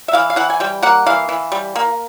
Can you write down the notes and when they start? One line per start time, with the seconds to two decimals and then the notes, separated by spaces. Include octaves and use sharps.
0.08 E5
0.13 E3 F5
0.30 F5
0.36 E3 F#5
0.50 G#5
0.60 G3 G5
0.83 A#3 F#5
1.06 E3 F5
1.29 E3
1.52 G3
1.76 A#3